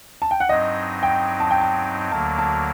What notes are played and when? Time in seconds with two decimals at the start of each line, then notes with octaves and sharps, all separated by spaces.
0.22 A5
0.31 G5
0.40 F#5
0.49 G2 F#3 C4 D#4 D#5
1.03 G5
1.40 A5
1.51 G5
1.61 A5
2.11 D2 D3 F#3 A#3 A5
2.39 A5